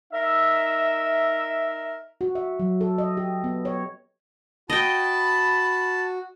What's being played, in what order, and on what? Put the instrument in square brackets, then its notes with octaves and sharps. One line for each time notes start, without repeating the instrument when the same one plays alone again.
[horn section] D#4 A#4 E5
[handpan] F#4
E5
F#3
A4
D#5
G4
B3
C#5
[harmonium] F#4 [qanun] D#5 G5 [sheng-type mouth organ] A5 [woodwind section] B5